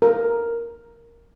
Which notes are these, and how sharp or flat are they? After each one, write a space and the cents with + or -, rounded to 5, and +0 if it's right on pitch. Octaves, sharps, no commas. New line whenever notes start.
A#4 +0